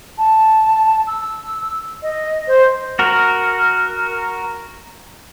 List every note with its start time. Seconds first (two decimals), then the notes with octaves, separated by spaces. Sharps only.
0.18 A5
1.07 E6
2.03 D#5
2.48 C5
2.99 F#4 A#4